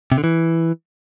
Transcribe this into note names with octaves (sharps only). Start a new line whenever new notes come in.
C3
D3
E3